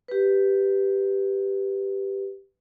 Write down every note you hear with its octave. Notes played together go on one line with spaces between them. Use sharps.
G4 B4